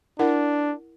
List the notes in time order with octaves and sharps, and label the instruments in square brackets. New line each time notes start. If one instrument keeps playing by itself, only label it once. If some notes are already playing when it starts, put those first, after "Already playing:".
[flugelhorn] D4 [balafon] E4 A#4 F#5